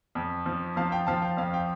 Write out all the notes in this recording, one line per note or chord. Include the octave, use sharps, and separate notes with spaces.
F2
F3
F3 F5 A5
G5
F3 F5 A5
G5
F2 F5
G5